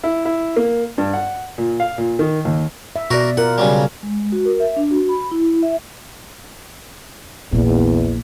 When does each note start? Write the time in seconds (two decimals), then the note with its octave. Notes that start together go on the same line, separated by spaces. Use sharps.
0.04 E4
0.25 E4
0.56 A#3
0.98 G2
1.14 F#5
1.58 A#2
1.80 F5
1.98 A#2
2.19 D#3
2.45 D#2
2.96 E5
3.11 B2 F#4 A#4 D5
3.37 F4 A#4 F#5
3.58 C#3 F#3 G3
4.03 G#3
4.32 F#4
4.45 A#4
4.60 E5
4.76 D4
4.91 F#4
5.09 B5
5.31 E4
5.63 E5
7.52 A#1 E2 A#2